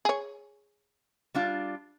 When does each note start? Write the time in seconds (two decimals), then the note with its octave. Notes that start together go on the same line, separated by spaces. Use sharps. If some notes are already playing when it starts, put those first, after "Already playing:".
0.05 G#4 C#5
1.35 G3 D4 F4